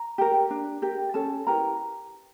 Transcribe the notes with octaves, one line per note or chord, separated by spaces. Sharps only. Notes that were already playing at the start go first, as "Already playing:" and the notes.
Already playing: A#5
G4 A#4
D4
G4 A#4
C#4 A4 A5
E4 G4 A#4 B4 A#5